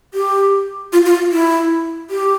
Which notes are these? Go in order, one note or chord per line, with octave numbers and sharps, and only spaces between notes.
G4
F4
F4
E4
G4